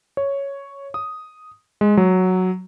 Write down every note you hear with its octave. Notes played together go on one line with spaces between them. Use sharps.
C#5
D#6
G#3
F#3